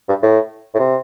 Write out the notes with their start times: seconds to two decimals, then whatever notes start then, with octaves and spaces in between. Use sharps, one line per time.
0.08 G2
0.22 A2
0.74 A2
0.79 C3